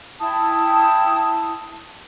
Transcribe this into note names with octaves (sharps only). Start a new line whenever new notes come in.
E4 G5 A5 D#6